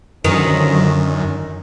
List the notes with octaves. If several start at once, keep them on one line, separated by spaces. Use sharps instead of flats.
F#2 D3 D#3 F3 C#4